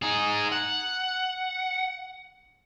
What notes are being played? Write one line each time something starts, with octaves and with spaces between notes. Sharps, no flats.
D#4 G#4
F#5